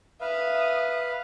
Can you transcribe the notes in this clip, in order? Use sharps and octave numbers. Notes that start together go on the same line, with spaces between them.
B4 E5 F5 D#6